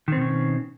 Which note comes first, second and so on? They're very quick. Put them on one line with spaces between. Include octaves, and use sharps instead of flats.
D#3 C4 B2 C#4